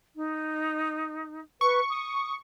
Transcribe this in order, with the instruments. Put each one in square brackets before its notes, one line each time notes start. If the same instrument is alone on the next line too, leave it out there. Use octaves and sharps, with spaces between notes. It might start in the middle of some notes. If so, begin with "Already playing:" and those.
[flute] D#4
[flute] B4 [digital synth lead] C#6
[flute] D#6